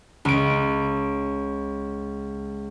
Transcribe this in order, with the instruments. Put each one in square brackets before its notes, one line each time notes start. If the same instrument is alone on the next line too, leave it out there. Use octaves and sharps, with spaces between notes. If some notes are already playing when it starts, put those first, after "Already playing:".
[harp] C#2 D7